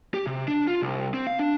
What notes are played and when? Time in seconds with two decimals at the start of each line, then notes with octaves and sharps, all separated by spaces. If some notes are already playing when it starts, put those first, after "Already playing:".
0.14 G4
0.27 C3
0.48 D4
0.67 F4
0.82 C2
1.14 C4
1.27 F5
1.39 D4